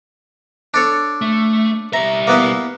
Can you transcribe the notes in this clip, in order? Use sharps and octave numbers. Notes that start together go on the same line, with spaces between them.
D4 A4 C#5
A3
G3 E5 A#5
A#3 B3 E4